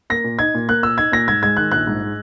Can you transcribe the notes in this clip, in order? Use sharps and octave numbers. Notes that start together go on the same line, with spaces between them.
A#3 A#6
A#2
D#4 G#6
A#2
A#3 F#6
A#2 E6
D#4 G#6
A#2 A#6
G#2 G#6
G#3 G#6
D#3 F#6
A#1 F#6
G#2
G#3